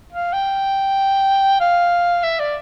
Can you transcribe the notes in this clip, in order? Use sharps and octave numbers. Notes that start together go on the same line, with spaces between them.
F5
G5
F5
E5
D5